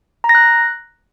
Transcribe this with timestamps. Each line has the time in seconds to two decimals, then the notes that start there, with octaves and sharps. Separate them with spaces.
0.24 A#5
0.29 A#6
0.35 F#6